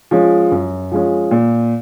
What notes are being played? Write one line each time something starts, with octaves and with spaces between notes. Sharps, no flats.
F3 G#3 C#4
F#2
F3 G#3 C#4
A#2